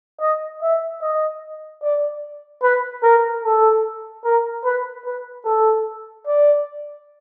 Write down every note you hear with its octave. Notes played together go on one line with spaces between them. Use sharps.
D#5
E5
D#5
D5
B4
A#4
A4
A#4
B4
B4
A4
D5